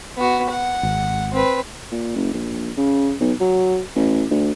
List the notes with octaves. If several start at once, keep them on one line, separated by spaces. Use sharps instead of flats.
B3 F#4
F#5
G#1
C4 B4
A#2
F#1
A#1
C#3
B1
F#3
A1
D2